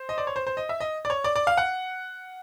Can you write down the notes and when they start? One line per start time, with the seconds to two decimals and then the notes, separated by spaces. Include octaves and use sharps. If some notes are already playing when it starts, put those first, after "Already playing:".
Already playing: C5
0.09 D#5
0.18 D5
0.27 C#5
0.36 C5
0.47 C5
0.57 D#5
0.69 E5
0.80 D#5
1.05 D5
1.10 C#5
1.24 D5
1.36 D5
1.47 F5
1.57 F#5